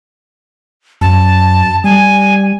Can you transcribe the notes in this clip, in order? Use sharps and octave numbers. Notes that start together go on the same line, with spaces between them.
F#2 A5
G3 G#5